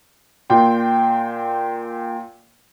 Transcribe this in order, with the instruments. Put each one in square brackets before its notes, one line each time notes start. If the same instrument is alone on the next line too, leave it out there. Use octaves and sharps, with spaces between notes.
[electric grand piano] A#2 G5 C6